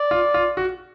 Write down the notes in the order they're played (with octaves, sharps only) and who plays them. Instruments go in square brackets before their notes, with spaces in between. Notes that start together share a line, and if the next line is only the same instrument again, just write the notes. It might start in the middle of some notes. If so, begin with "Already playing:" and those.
Already playing: [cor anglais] D5
[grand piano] F4
F4
F#4